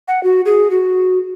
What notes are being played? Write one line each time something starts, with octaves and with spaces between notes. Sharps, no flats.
F#5
F#4
G#4
F#4